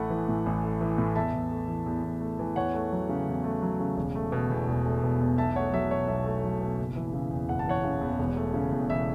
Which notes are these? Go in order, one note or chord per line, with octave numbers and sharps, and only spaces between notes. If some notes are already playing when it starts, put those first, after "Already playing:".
Already playing: A1 A3 F#5 B5
E3
A2
A1
A3
E3
A2
E2 E5 A5
E2
A3
E3
E2
E2
A3
E3
E2 C#5 F#5
A3
F#3
C#3
E2
A3
F#3
C#3
E1
A3
B2
E2
E1
A3
B2
E2
B1 E5 A5
A3 C#5 F#5
F#3 E5
B2 C#5
B1 E5
A3
F#3
B2
F#1
E3
C#3
E2
F#1 F#5
A5
E3 C#5 F#5
C#3
E2
E1
A3
C#3
E2
E1 E5